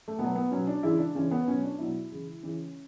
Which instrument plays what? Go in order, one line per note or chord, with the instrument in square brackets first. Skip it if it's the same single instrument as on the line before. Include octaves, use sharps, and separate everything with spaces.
[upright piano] A3
B2 F#3 B3
B3
B2 F#3 C#4
D4
C#3 E3 G#3 E4
D4
C#3 E3 G#3 C#4
B3
B2 F#3 C#4
D4
B2 F#3 E4
C#3 E3 G#3
C#3 E3 G#3 C#4